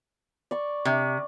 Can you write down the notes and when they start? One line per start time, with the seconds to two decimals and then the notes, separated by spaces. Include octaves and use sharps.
0.51 D5 C#6
0.85 C3